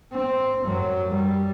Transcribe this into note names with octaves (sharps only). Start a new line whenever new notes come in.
C4
F#2 F#3
G3